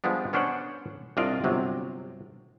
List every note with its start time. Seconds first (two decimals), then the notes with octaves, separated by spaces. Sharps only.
0.04 F3 G3 G#3 B3 D4
0.33 B3 C#4 D4 C5 C#5 F#5
1.17 C2 C3 D4 F4 D5 D#5
1.44 G1 C3 F#3